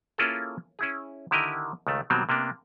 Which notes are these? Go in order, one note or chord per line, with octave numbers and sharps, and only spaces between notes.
A#3 C#4 E4 F4 G#4 A4
C#4 E4 G#4
D3 D#3 E4 G4 A#4 D#5
C#2 D#3 A3
B2 D#3 F#3 G3 A#3 C4
C3 A#3 B3 D4